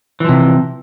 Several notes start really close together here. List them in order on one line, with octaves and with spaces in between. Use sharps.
E3 F3 C3